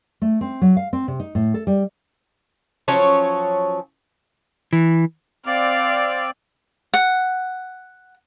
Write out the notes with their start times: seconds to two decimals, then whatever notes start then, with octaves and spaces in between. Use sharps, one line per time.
0.22 A3
0.41 C4
0.61 F#3
0.77 F5
0.93 C4
1.08 C3
1.20 D#4
1.35 A2
1.54 A4
1.67 G3
2.88 F3 F#3 C#4 C#5
4.73 E3
5.46 C4 D5 F5
6.94 F#5